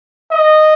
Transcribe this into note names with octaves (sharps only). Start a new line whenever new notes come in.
D#5